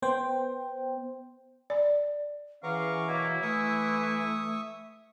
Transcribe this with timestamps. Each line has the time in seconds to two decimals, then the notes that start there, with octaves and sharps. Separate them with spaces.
0.02 B3 C5 G5
1.70 D5
2.63 E2 E3 B3 C#4 F5 A#5 C#6 D6
3.08 B2 F#3 A#3 E4
3.42 E3 A3 E5 C#6 D#6